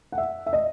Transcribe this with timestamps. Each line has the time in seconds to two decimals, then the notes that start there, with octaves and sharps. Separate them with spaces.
0.12 F#5
0.18 E5
0.46 E5
0.53 D#5